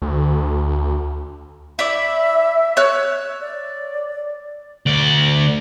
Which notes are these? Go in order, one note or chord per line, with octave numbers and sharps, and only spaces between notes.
D2
E4 D5 E5
C#5 E6 F#6
D5
D2 D5